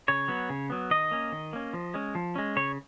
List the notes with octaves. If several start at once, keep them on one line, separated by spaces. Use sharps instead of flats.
C#3 C#5
F#3 B3
C#3
F#3 B3
D#3 D#5
A#3 C#4
D#3
A#3 C#4
F3
G#3 C#4
F3
G#3 C#4
C#3 C#5